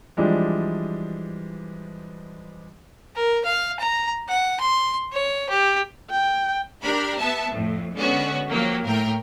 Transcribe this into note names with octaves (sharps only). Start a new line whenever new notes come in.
E3 F3 G3 G#3 D4
A#4
F5
A#5
F#5
C6
C#5
G4
G5
D4 G4 A#4 B5
B3 E5 A5
F2 A2
D3 G#3 B3 C#4 F#4
F3 F#3 A#3 G4
A2 A#4 G5